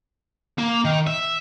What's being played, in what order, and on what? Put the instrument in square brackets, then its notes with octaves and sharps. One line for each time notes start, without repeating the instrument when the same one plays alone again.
[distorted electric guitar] A#3
D#3
E5